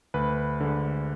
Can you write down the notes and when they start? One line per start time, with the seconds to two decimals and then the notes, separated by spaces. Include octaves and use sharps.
0.14 D2 B4
0.60 D3 G#3